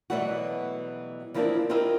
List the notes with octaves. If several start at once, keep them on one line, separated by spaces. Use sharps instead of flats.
B2 E3 F#3 G3 A3 F#4
E3 F3 A#3 C4 D4 E4
C4 E4 F4 G4 A#4 D#5